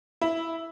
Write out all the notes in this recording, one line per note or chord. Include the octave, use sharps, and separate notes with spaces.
E4